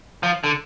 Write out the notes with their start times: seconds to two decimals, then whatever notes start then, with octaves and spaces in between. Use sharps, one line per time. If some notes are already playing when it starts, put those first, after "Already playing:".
0.23 F3
0.44 D3